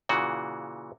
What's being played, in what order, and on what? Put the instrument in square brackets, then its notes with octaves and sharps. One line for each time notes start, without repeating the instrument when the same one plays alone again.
[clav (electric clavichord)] A#2 C#3 E3 F#4